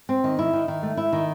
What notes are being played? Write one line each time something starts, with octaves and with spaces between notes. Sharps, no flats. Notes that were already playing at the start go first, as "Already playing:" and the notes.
C4
D#3
E4
D#3
D#3
A3
E4
D#3